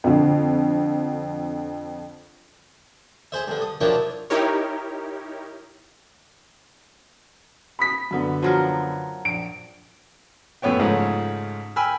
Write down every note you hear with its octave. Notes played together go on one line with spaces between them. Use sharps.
F2 D3
G#4 C5 E5
G2 D3
D#6
F3 F#3 A#3 D4 E4 G4
D#4 E4 G4 A#4 C#5
B5 D#6 B6
F#2 D3 B3
F3 F#3 A#4
A#1 D7
F#2 A2 B3 C#5 G5
G#2 C#3 F3 A3 C#4
G5 G#5 B5 E6 F6